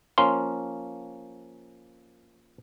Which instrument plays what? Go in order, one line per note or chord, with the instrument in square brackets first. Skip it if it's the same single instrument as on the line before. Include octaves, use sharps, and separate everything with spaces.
[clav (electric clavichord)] F3 A#3 C#4 [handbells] C6